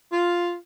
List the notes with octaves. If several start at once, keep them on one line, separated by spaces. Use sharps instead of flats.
F4